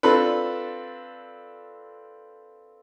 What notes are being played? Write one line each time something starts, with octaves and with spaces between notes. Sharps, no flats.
C4 D4 F4 A4 B4